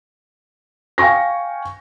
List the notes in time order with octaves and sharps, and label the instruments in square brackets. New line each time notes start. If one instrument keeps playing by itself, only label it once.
[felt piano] F5 G5 G#5 C#6 A#6